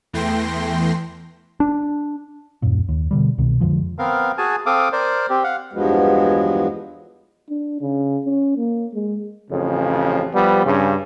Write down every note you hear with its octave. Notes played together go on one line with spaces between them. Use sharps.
E2 E3 A3 G5 C6 A#6
D4
D#1 F#2 A#2
D#2
B2 D3 G3
C2 B2 D#3
F2 D3 F3 G#3
B3 C4 A#4 F5
F#4 G#4 G#5 A5
C4 A4 F5 D6 D#6
A#4 C5 D5
C4 G4
F5 F#5
E2 G2 F3 F#3 G#3 B3
D4
C#3
C#4
A#3
G#3
A1 F2 C#3
F3 G3 B3
G2 C#3